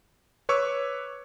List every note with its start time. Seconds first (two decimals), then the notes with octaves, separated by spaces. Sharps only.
0.49 B4 C#5 C#6 D6 E6